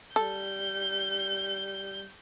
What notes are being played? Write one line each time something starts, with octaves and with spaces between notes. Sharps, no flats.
G3 A4 G6